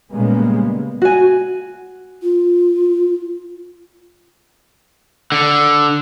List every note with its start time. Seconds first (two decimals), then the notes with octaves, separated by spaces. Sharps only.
0.11 A#2 C#3 G3 G#3 A#3 B3
1.02 F#4 G#5
2.22 F4
5.32 D3